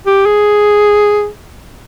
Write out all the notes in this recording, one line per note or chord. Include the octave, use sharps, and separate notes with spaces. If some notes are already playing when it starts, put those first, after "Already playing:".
G4
G#4